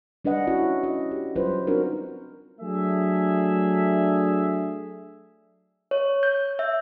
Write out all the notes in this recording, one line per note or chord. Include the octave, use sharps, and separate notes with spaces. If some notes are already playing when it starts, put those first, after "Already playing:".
G3 D4 B4 D#5 F#5
C#4 E4 F#4
D#5
G4
F#3 G3 C#4 F4 B4 C5
C4 D4 D#4 F#4 A#4
F#3 A3 D4 G#4 E5
C#5
G6
E5